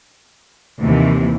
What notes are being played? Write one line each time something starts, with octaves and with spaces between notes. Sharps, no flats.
D#2 C3 E3